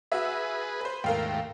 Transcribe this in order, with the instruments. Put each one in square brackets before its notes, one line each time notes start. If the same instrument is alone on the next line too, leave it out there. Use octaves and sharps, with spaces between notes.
[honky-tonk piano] F#4 E5 [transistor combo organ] G#4 B4
[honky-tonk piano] B4 C5
[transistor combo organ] D#2 G#2 A3 [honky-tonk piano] A#4 F5 G5